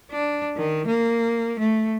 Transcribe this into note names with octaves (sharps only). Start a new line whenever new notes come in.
D4
D#3
A#3
A3